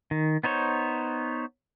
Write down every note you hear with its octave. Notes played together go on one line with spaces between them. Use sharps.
D#3
B3 D#4 C5 C#5